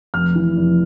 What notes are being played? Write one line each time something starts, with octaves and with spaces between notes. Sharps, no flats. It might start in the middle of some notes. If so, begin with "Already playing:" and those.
F1 F6
E3
F1